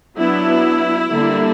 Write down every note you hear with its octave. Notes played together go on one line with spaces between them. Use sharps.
F#3 B3 D4 E4
D3 G3 A#3 D4